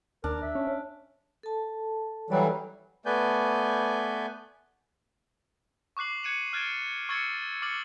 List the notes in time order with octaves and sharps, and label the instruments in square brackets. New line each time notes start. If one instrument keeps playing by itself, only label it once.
[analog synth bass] D#2 [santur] D4 [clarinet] A#4
[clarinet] E5
[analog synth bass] C#4
C#4
[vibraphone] A4 A5
[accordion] E3 F#3 G3 [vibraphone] A4 D5 B5
[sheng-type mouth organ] A3 B3 B4 D5 G#5 G6
[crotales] C#6 D6 F#6 C7 F#7
F#6 G#6 C#7 D#7 E7 F#7
F6 F#6 G#6 A6 D7 E7
C#6 E6 G#6 A6 C#7
A6
D6 F6 A6 C#7 F#7